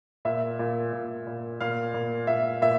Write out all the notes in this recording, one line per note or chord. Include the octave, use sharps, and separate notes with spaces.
A#2 E5
A#2
A#2
A#2
A#2 F5
A#2
A#2 E5
A#2 E5